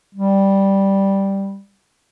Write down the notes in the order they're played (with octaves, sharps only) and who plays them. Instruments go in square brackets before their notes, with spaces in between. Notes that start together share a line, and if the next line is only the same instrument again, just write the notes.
[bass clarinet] G3